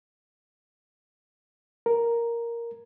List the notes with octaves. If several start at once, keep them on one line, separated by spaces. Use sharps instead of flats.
A#4